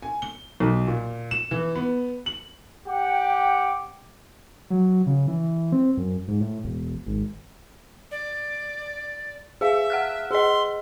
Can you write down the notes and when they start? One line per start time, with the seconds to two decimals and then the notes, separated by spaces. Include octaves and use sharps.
0.02 G#5
0.22 G7
0.60 B1
0.87 A#2
1.31 E7
1.51 E3
1.75 B3
2.26 F#7
2.88 G4 F#5 G5 D6
4.70 F#3
5.06 C#3
5.28 E3
5.72 C4
5.97 F#2
6.28 G#2
6.40 A2
6.64 E1
7.06 G#1
8.11 D5
9.61 G#4 E5 F5
9.90 F#5 F6 F#6
10.31 G#4 D#5 C6